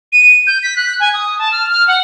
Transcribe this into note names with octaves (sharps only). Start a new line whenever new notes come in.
D#7
G6
B6
F#6
G#5
D#6
A5
F6
F6
F#5